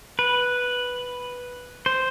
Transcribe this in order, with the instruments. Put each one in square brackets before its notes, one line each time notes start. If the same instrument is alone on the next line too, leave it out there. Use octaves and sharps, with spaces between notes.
[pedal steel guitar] B4
C5